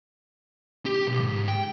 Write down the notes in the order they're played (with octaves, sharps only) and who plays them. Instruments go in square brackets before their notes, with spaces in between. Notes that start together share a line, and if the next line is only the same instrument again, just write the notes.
[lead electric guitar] G4
B1
G#2
G5